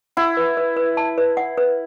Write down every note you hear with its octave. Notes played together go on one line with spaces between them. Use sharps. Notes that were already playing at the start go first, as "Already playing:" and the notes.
E4 F#5
B4
B4
B4
A5
B4
F#5
B4